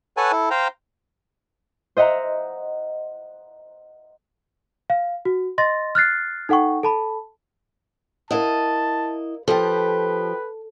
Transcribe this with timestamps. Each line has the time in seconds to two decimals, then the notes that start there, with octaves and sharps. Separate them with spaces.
0.17 A4 B4 C#5 F#5 G#5 A5
0.32 E4 A4
0.51 C5 F5 G5 A#5
1.97 C5 D#5 E5 F#5 A#5
4.90 F5
5.25 F#4
5.58 D#5 C6 A6 A#6
5.95 F6 F#6 A6 C7
6.49 D#4 A4 F#5 G5 C#6
6.83 A4 A5 B5
8.31 E4 A#4 D#5 F5 F#5 A5
9.48 F3 G4 A4 B4